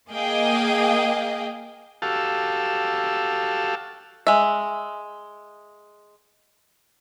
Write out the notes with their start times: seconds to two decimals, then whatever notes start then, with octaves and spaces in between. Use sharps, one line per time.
0.10 A#3 G#4 D#5 F5 G5
2.02 F#4 G4 A4 F5 A5 E6
4.27 G#3 E5